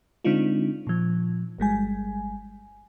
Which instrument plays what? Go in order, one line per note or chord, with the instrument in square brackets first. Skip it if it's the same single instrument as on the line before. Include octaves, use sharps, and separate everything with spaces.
[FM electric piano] D3 G#3 C4 D4 D#4 F4
A#2 F3
G1 G3 G#3 G#5